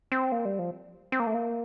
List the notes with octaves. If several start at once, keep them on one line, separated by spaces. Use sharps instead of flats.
C4
A#3
G3
F3
C4
A#3
A3
A#3